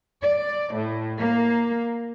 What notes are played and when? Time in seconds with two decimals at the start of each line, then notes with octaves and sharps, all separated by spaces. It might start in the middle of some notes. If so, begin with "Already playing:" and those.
0.22 D5
0.74 A2
1.20 A#3